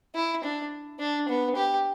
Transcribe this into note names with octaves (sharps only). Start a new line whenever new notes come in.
E4
D4
D4
B3
G4